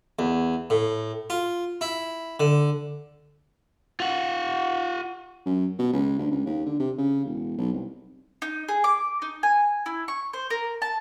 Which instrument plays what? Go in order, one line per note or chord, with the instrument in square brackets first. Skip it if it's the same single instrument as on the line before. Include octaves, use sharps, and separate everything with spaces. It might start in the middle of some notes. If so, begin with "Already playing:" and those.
[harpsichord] E2
A2
F4
E4
D3
[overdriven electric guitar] F4 F#5
[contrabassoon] F#2
B2
C#2
D2
C#2
D#2
D3
C3
C#3
E1
B1
C2
[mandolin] D#4
G#4
D6
D#4
G#5
E4
C#6
C5
A#4
A5